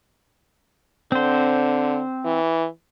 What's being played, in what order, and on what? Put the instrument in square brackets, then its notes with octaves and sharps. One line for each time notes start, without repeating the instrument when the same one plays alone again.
[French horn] D3 [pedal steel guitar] C4 C5
[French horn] E3